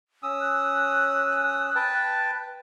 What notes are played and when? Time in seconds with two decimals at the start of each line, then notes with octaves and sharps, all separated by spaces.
0.23 C#4 D#6 E6
0.41 F#6
1.75 B4 G5 A5